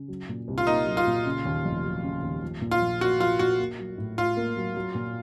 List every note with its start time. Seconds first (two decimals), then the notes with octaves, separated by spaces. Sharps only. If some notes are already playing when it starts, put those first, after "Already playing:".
Already playing: C#3
0.08 F#3
0.29 A#2
0.48 C2
0.58 F4
0.67 A#3 D#4
0.86 F#3
0.97 F4
1.07 A#2
1.25 C#3
1.45 D#2
1.64 F1
1.85 F#3
2.03 C#3
2.22 D#2
2.43 F3
2.61 A#2
2.71 F4
2.81 A#1
3.00 A#3 F#4
3.20 F3 F4
3.39 A#2 F#4
3.59 A#3
3.79 F#3
3.98 A2
4.18 A2 F4
4.37 A#3
4.57 F#3
4.76 F#3
4.95 A#2